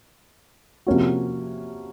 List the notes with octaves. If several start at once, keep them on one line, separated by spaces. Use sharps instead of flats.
C3 F3 A#3 C#4 F#4